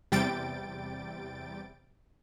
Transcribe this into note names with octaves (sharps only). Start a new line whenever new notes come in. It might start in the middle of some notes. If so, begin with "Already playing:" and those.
E2 C3 G3 G5 A6 D7